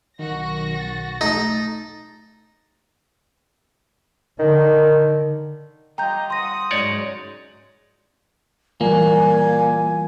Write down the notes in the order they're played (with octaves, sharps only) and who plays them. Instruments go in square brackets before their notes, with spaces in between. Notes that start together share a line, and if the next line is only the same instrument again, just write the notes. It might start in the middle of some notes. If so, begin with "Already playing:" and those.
[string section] B1 F#4 A#6 [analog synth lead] D#3
[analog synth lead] A6
[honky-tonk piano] A3 [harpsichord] D#4
[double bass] D3 [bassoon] D#3
[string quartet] G3 F4 D#5 [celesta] G5 G6 [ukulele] A#5
[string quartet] F#5 D#6 [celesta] C6 A#6
[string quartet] G#2 C#3 F#3 [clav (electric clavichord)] D#4 C#5 D5
[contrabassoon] A#2 [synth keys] E3 G3 [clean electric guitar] A#3 [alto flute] G#5